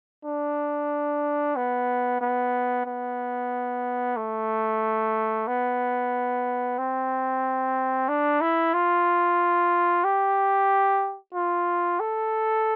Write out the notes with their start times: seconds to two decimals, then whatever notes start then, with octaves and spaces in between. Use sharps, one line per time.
0.25 D4
1.56 B3
2.21 B3
2.86 B3
4.17 A3
5.47 B3
6.78 C4
8.09 D4
8.41 E4
8.73 F4
10.04 G4
11.34 F4
12.00 A4